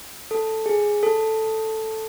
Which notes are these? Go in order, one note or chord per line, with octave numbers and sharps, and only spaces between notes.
A4
G#4
A4